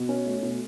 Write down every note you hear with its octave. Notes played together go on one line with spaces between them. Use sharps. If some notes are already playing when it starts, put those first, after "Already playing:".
Already playing: B2
C#4
A3
B2